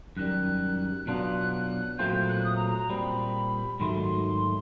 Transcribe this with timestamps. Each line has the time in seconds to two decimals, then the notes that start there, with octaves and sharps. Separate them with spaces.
0.17 F#2 D#3 G3 F#6
1.07 B2 F#3 B3 D4 F4 F#6
1.98 A#2 F#3 A3 C4 F4 G6
2.29 F#6
2.44 D#6
2.56 A#5
2.66 A#5
2.78 A#5
2.89 A#2 G3 C4 B5
3.80 G#2 D#3 F#3 A3 C6